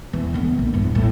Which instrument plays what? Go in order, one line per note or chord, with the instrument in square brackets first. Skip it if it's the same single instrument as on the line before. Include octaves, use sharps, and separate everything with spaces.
[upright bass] E2 E3
D3 B3
A#1
E2 G2
A2